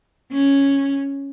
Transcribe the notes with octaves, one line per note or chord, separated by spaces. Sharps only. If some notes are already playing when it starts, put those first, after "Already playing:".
C#4